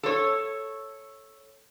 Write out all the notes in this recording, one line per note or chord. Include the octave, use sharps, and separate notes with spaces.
A4 C#5